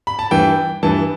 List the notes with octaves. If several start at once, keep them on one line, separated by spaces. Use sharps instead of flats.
B5
A5
G2 E3 G5
G2 E3 A5